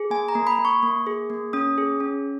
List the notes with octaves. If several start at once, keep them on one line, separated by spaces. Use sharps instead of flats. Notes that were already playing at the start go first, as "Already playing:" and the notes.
Already playing: G#4
A#3 G#5
A#5
A#3
B5
A#3
C#6
A#3
G#4
A#3
C#4 D#6
G#4
C#4